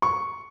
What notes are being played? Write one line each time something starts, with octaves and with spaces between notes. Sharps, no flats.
C#6